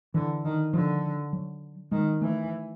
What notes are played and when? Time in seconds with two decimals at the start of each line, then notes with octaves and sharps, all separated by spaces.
0.14 D3 E3
0.44 D#3
0.73 D3 F3
1.33 F#3
1.92 D#3 G#3
2.21 E3 A3